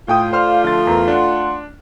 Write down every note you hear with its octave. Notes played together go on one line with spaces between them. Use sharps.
A2 A3 F4 G5 D#6
C5 D5 F5 C6 F6
D3 F3 A6
E2 A#4
D4 F#5 C6